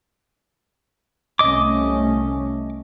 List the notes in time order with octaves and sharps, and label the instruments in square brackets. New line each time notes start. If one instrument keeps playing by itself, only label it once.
[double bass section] C2 A3 C#4 [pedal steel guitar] D#5 D6